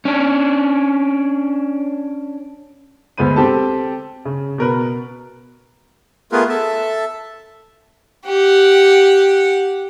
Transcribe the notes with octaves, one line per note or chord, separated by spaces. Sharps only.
C#4 D4
D2 G#3 B3 C5 D#7
C4 G4 A4 A5
C#3
B2 A#4 B4
A3 B3 F4 G#4 A#4 B4
A4 E5 A5
G4 F#5